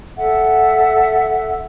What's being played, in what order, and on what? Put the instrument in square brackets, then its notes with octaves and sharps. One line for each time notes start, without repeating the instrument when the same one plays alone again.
[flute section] A4 E5 F#5